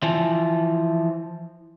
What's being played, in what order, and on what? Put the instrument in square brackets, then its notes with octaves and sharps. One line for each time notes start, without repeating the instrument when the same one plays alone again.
[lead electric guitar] E3 F3